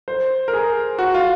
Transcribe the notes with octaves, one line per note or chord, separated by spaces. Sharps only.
C5
A#4
G#4
F#4
F4